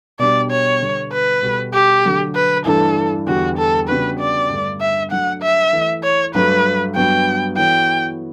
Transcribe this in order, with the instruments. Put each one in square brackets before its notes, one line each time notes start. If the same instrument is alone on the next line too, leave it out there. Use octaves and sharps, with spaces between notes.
[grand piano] B2 G3 D4 G4 [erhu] D5
[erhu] C#5
[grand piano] D3 G3 B3
[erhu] B4
[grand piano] B2 G3 B3 F#4 A4
[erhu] G4
[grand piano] D3 F#3 A3
[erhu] B4
[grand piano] G2 E3 A3 D4 [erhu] A4
[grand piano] E2 D3 G3 [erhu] F#4
[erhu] A4
[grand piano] C#3 G3 B3 D4 F#4 [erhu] B4
[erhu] D5
[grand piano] G2 D3 A3
[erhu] E5
[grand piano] F#3 A3 D4 [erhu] F#5
[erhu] E5
[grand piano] E3 A3 E4
[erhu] C#5
[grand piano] G2 F#3 A3 [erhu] B4
[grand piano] G2 F#3 B3 F#4 [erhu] G5
[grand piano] E3 B3 F#4 A4 C#5 [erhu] G5